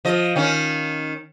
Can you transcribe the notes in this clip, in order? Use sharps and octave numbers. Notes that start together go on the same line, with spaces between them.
F3 D#5
D#3 C#4